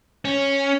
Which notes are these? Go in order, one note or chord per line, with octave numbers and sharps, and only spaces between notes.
C#4